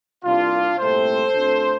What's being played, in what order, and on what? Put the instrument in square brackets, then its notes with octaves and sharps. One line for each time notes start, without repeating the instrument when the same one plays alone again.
[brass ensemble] C2 C3 G3 A#3 D4 F4
C2 A#2 A3 C4 A4 C5
D2 D3 A3 C4